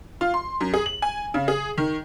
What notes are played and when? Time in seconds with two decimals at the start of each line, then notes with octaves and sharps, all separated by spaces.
0.21 F4
0.34 C6
0.60 F#2
0.74 G#4
0.86 F#7
1.02 G#5
1.34 C#3
1.48 G#4
1.78 D#3